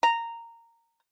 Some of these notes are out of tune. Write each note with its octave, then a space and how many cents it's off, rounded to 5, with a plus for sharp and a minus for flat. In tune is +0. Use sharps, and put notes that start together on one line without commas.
A#5 -10